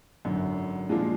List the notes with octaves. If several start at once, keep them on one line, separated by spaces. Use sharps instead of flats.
G#1 F#2 D3
A#2 F3 G#3 D4